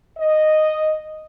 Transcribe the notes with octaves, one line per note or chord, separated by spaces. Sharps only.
D#5